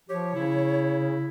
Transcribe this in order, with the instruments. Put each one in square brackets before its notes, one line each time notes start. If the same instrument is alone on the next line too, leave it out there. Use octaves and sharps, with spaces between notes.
[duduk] F3 [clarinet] G4 [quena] C#5
[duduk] C#3 [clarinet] E4